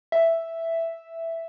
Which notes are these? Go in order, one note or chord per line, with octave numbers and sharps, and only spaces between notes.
E5